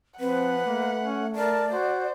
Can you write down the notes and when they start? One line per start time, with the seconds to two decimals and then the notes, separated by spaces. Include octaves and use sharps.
0.20 F3 C4 B4 F#5
0.66 A3 A#3
1.03 C#4
1.36 A#4 D5 A5
1.72 F#4 C5